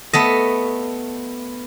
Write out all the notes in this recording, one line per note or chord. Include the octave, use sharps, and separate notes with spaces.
A3 B3 D#5